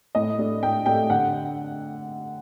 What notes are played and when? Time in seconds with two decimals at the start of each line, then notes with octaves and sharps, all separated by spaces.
0.15 A2 D#5
0.39 A3 D4
0.63 A2 G5
0.86 A3 D4 G5
1.10 D3 F#5